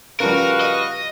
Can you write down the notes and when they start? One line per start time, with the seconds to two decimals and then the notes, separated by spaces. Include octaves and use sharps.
0.20 C#3 F3 G3 F#4 A#4 B4 F5
0.60 D#5